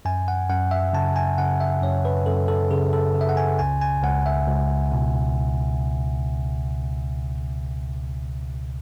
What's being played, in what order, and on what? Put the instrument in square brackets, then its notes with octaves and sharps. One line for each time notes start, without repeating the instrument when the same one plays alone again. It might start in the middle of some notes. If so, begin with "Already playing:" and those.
[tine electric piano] F#2 G#5
F#5
F#2 F#5
E5
C#3 A5
G#5
C#3 F#5
E5
F#2 C#5
B4
F#2 A4
A4
C#3 G#4
A4
C#3
E5
F#5
G#5
C#2 G#5
G#5
C#2 F#5
E5
C#2
B2